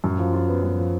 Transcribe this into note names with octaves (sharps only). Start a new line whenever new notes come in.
F#2
F3
F4
B3
F#2
F3